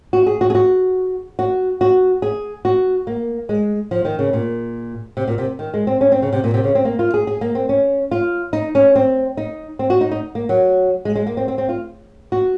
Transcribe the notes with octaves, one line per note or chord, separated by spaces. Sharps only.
F#4
G#4
F#4
G#4
F#4
F#4
F#4
G#4
F#4
A#3
G#3
F3
D#3
C#3
A#2
C3
A#2
C3
D#3
G#3
C4
C#4
C4
C#3
C3
A#2
C3
C#3
C4
A#3
F4
G#4
G#4
A#3
C4
C#4
F4
D#4
C#4
C4
D#4
C4
F#4
D#4
D#4
A#3
F#3
G#3
G#3
A#3
C4
C4
C4
F4
F#4